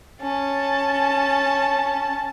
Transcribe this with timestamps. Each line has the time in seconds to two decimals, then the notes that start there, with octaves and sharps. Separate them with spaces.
0.21 C#4 A5